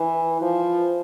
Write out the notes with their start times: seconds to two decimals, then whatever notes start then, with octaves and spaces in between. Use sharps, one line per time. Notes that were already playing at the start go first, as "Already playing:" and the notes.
Already playing: E3
0.41 F3